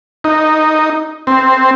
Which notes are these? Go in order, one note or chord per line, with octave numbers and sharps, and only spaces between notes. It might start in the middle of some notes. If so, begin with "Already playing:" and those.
D#4
C4